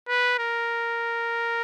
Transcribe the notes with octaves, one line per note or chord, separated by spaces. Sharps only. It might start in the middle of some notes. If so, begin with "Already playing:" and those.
B4
A#4